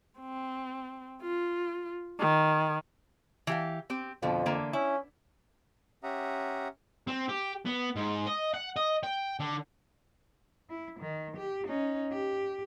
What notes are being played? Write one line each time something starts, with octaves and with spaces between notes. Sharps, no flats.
C4
F4
D#3
E3 G4 F5
C4 G4
F2 B2 D3 F3
D3 E3 A#3
C#4 E4
C#4 G4 E5 F#5 A#5 D#6
C4
G4
B3
G#2
D#5
F#5
D#5
G5
D3
E4
D#3
G4
C#4 D#4
G4